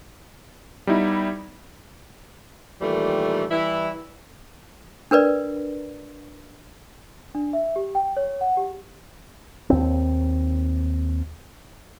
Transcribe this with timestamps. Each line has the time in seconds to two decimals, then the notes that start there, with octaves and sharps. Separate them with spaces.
0.87 G3 B3 D#4 E4
2.81 A#2 D#3 E3 G3 A3
3.51 E3 G3 E4
5.11 D4 A#4 B4 D5
7.35 D4
7.53 E5
7.76 G4
7.95 G5
8.17 C#5
8.41 F#5
8.57 G4
9.70 D#2 C4